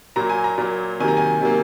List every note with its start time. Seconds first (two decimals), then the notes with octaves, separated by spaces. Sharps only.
0.16 A#2 F#3 A#3 A#5
0.29 G#5
0.44 A#5
0.58 A#2 F#3 A#3
1.00 C3 D#3 F#3 A#3 G#5
1.08 A#5
1.17 G#5
1.41 C3 D#3 F#3 A#3